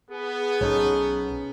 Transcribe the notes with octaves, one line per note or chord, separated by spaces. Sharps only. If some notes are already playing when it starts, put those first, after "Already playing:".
B3 G#4
B1 C#4 D#4 A4